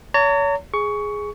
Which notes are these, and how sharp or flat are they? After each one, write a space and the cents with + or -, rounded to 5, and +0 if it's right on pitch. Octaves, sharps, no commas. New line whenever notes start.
C#5 +35 A#5 -40
G#4 +0 C#6 +15